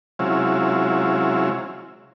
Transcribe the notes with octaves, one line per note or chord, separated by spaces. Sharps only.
C3 F#3 G#3 C#4 E4 F4